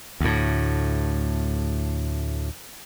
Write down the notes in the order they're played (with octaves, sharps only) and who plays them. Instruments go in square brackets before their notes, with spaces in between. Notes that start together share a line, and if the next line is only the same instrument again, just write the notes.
[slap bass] D2 A2